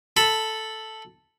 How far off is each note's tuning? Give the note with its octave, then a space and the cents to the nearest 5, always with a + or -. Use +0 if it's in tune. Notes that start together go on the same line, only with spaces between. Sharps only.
A4 +0 B5 +0